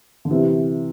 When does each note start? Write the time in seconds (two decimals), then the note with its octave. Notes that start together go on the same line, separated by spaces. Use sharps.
0.25 D3
0.30 C3 E3